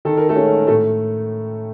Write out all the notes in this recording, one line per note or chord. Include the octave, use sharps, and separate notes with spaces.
D#3 A4
A#4
A3 A4
G#3 C#4
A2 A3 A4